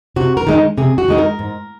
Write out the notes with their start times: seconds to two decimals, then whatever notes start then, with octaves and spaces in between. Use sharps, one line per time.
0.16 C3 F#4
0.37 A#4
0.47 D#3 G#3 D#4
0.78 C3 G#4
0.98 F#4
1.08 D#3 G#3 D#4
1.18 A#4
1.39 G#2